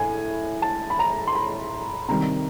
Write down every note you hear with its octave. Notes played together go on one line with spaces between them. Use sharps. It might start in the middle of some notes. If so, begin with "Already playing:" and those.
Already playing: A2 G#5
A5
B5
A#5
C6
B5
C3 D#3 G3 A#5